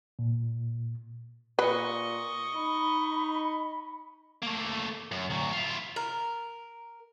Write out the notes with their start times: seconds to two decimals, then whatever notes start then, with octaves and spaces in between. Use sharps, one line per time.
0.19 A#2
1.59 A#2 B4 D#5 C#6
2.55 D#4 B5
4.43 A3 A#3
5.11 F#2
5.30 D2 F#3
5.53 E4 F4
5.96 A#4